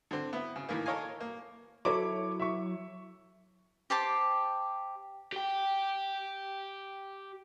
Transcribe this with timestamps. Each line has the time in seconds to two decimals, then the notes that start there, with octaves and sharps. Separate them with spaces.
0.11 D3 C4
0.33 B3 E4
0.56 C#3
0.69 A2 D#3 E3 A#3
0.86 A4 A#4 C#5 D#5 F5 G#5
1.20 A#3
1.85 F#3 E4 A4 C#5 D6
2.40 E5 C#6
3.90 G4 C5 A5 D6
5.32 G4 G5